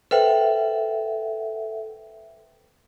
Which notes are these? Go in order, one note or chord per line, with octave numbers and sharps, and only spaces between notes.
A4 B4 C5 E5 F#5 G5